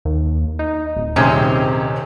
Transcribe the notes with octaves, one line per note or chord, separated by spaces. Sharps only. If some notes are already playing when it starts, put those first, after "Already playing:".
D#2
D#4
D1
D#1 C3 C4 C#4 D#4 G#4